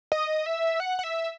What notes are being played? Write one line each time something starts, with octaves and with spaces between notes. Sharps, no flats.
D#5
E5
F#5
F#5
E5